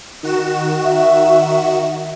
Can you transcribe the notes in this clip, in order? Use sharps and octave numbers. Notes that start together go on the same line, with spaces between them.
D#3 F#4 E7
E5